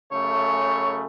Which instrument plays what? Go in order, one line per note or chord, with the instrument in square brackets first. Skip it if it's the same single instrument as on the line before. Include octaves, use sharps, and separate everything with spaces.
[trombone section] F#2 C#3 A3 [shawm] C#5